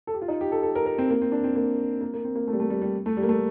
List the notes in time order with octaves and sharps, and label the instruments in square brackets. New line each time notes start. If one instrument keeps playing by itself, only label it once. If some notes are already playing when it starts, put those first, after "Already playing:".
[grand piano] A4
G4
F4
D#4
G4
A4
A4
A#4
A#4
C4
A#3
C4
D4
C4
A#3
A#3
A#3
C4
A#3
A3
G3
A3
G3
G3
A3
G3
A#3
A3